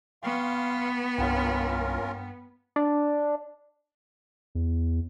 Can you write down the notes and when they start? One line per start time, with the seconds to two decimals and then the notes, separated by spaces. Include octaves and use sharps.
0.23 B3 F5 G5 C6 C#6
1.18 C2 G2 C#4 F4 A#4 F#5 G5
2.76 D4
4.55 E2